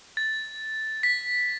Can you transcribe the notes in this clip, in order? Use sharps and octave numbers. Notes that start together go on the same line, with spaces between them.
A6
B6